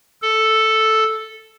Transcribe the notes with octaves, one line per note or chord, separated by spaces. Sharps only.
A4